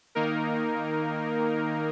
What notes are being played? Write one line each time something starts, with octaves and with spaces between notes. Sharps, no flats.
D#3 A#3 D#4 A#4